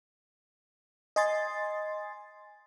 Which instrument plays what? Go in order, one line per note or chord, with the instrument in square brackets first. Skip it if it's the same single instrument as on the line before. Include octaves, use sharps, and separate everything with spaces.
[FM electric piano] D#5 G#5 C6 A6